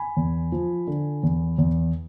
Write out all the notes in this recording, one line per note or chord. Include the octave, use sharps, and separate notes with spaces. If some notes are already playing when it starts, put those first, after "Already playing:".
Already playing: G#5 B5
E2
F3
D3
E2
E2